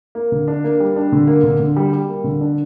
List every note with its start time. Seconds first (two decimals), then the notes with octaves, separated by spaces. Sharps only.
0.15 A#3
0.32 D3
0.48 D4
0.64 A#3
0.80 G3
0.96 D4
1.12 D3
1.27 A#3
1.44 D3
1.60 D3
1.76 G3
1.93 G3
2.09 A#3
2.24 D3
2.41 D4